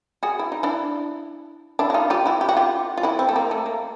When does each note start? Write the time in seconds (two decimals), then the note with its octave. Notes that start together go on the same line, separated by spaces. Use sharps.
0.23 F#4 G#4
0.39 E4
0.52 D#4
0.63 D4 E4
1.79 D4 E4
1.90 F#4
1.94 D#4 F4
2.10 F4 G4
2.26 E4 F#4
2.41 G4
2.49 F#4
2.57 F4 G4
2.98 F4
3.03 E4 F#4
3.19 C4
3.29 A3
3.36 A#3
3.51 A3
3.66 A#3